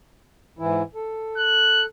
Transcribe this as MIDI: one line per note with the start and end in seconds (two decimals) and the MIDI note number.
0.59 0.83 44
0.59 0.83 52
0.59 0.83 64
0.95 1.86 69
1.37 1.85 90